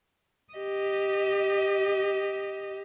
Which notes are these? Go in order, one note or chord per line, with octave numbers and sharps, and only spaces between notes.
G4 D#5